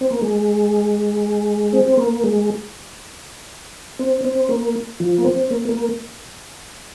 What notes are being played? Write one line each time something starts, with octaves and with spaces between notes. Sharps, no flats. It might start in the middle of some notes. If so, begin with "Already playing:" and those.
C4
A#3
G#3
C4
A#3
G#3
C4
C4
A#3
F3
A#3
C4
A#3
A#3